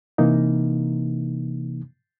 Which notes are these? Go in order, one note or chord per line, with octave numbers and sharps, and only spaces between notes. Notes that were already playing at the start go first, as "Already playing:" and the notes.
C3 E3 A#3 D#4